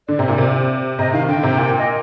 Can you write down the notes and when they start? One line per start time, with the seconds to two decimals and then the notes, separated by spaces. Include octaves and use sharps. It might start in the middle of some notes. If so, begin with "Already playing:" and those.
0.08 D3 D5
0.19 C3
0.28 A#2
0.38 C3
0.99 C3 D#5
1.13 D#3 F5
1.28 D3 G5
1.43 C3
1.58 A#2
1.78 D#5